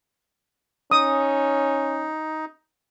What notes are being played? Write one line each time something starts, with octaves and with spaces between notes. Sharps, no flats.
C#4 D#4 D#6